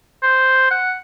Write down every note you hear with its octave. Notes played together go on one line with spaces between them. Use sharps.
C5
F#5